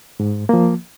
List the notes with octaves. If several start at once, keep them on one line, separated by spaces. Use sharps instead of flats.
G#2
F3 A#3